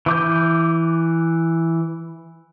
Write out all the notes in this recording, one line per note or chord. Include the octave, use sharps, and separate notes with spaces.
E3 D6 G6